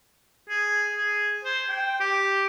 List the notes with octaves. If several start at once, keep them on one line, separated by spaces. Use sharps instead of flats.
G#4
G#4
C5
G5
G4